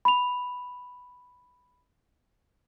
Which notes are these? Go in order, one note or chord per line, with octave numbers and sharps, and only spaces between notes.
B5 F7